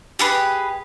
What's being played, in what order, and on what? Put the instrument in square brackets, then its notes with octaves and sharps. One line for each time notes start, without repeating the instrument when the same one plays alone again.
[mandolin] G4 G#4 B4